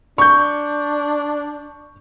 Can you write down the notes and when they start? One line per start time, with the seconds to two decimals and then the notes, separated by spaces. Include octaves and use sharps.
0.18 D4 C#6 G6